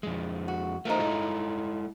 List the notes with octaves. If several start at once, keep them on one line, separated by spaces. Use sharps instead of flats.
F2 G#3
F#4
A3 D#4 F4 A#4 C5
G#3 E4 A4